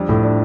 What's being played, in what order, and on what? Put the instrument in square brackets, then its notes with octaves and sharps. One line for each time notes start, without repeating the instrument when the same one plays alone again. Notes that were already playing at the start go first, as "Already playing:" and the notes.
Already playing: [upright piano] F2 [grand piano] G3 D4
[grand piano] A2
D4